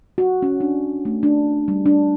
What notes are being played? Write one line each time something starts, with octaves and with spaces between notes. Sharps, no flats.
F#4
C#4
D4
A3
D4
G3
D4